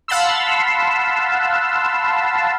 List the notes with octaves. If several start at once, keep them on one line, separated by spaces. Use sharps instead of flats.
F5 F#5 A5 B5 C6 E6